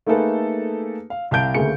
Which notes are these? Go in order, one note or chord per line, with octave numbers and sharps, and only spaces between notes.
A3 A#3 D#4 G#4 A4 B4
F5
C2 F5 A5 G6 D7
D2 C#3 A3 A#3 G#4 C#7